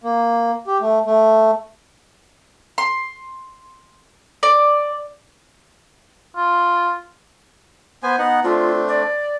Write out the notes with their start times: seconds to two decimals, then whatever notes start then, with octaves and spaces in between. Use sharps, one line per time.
0.04 A#3
0.67 G4
0.81 A3
1.06 A3
2.78 C6
4.43 D5
6.36 F4
8.03 B3 C5 G#5
8.19 B3 D#4 F#5
8.44 A3 C4 D4 F4
8.88 D5